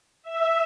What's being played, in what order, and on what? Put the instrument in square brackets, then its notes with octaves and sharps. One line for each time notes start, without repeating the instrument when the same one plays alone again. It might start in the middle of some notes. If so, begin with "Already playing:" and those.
[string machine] E5